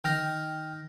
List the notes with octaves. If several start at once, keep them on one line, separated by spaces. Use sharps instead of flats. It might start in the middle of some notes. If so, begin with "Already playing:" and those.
D#3 D#4 G5 F6 A#6